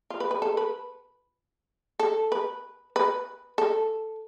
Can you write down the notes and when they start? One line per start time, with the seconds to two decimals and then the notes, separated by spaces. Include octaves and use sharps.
0.10 F4
0.20 B4
0.31 B4
0.42 A4
0.57 B4
1.99 A4
2.32 B4
2.96 B4
3.58 A4